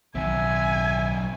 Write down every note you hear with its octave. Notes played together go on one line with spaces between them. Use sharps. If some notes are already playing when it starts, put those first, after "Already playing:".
B1 D#3 F#3 C4 E5 G#5